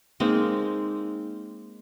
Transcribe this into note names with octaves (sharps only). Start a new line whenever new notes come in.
G#3 A#3 C4 D#4